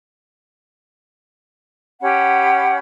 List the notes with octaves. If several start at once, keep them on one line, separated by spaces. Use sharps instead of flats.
C#4 G4 F#5 B5